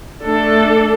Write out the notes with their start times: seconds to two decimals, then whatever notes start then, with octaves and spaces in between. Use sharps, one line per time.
0.23 A3 D4 A4